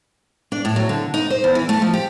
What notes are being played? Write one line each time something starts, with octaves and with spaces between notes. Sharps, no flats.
D4
A2
F#3
D3
D#4
C5
E2
E3
A3
F3
G4